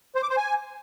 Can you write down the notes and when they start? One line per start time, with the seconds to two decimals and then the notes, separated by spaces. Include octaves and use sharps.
0.15 C5
0.23 D6
0.30 C5
0.37 G#5